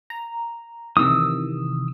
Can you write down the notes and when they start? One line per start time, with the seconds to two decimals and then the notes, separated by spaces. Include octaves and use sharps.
0.10 A#5
0.97 C3 D#3 E3 D#6 E6